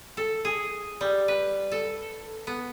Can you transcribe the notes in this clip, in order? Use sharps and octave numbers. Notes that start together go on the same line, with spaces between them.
A4
G#4
G3
B4
A4
B3